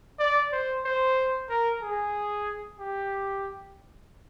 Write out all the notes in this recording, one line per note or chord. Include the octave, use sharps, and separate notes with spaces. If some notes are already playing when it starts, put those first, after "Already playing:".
D5
C5
C5
A#4
G#4
G4